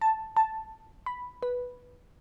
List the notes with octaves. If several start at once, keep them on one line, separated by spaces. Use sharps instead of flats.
A5
A5
B5
B4